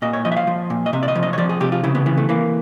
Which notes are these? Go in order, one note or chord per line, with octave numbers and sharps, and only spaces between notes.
A#2 D#5
C#5
F3 D#5
E5
F5
F3
A#2
D#5
C3 E5
D5
D#5
F3
D#5
C#5
F3 D5
G#4
C3 G4
F4
C#3 E4
B3
E3 B3
A3
E3 A#3